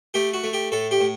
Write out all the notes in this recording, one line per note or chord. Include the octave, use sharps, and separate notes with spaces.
A3 G4
F#4
A3
G4
A2 A4
G4
A2